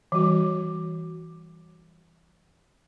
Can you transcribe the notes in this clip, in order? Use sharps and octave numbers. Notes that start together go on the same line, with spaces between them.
E3 G3 F#4